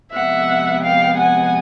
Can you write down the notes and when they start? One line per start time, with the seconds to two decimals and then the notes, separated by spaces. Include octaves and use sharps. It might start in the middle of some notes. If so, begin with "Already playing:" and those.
0.13 C3 F3 G#3 B3 E5 F#5
0.84 F5 G5
1.19 F#5 G#5